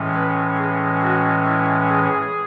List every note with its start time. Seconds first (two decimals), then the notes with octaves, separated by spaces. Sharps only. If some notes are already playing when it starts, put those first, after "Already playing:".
Already playing: A2 E3 G#3 C#4
0.14 B4
0.58 G#4
1.01 F#4
1.46 E4
1.89 G#4